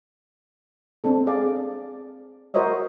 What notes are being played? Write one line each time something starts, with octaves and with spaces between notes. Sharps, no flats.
C4 D4 A4
G#4 D5 F5
F#4 A#4 C5 C#5 D#5 E5